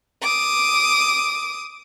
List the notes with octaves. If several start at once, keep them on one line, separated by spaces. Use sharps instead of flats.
D6 D#6